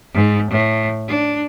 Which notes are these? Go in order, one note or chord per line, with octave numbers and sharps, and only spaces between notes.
G#2
A2
D4